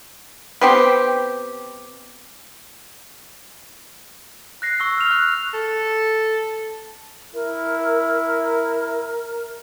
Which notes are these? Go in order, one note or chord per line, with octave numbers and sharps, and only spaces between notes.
B3 C4 G4
F#6 A#6 C7
C#6 E6
F6 F7
C#6 F#6 F7
A4
E4 A#4